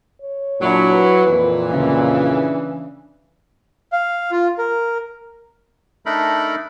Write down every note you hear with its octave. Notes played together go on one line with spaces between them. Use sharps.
C#5
A#2 F#3 D4 E4
B4
F2 A#2 E3
D2 C#3
D4
F5
F4
A#4
A3 D4 D#4 A4 A#4 B5